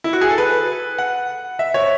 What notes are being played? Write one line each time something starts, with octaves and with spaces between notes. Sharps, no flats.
E4
F#4
G#4
A4
B4
F#5
E5
C#5